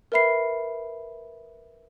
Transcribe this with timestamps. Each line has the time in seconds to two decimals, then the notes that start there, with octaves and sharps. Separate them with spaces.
0.12 A#4 B4 E5 B5 C7